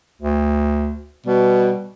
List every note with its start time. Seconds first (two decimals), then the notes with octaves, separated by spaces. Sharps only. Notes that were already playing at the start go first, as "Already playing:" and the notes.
0.22 D2
1.26 B2 G3